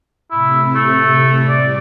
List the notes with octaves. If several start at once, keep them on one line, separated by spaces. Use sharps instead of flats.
A2 C3 E4
A3
G3 D5